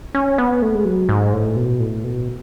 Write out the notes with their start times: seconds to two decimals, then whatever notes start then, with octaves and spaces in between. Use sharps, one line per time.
0.15 C#4
0.38 B3
0.62 A3
0.75 G#3
0.85 F#3
1.09 G#2
1.33 A2
1.56 B2
1.80 A2
2.04 B2